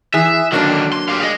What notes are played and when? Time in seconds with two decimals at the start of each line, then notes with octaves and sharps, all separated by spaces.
0.14 E3 G#4 E5
0.52 D3 D#3 F#3 A#3 D4
0.93 C6
1.09 G4 F5
1.21 G#4 D#5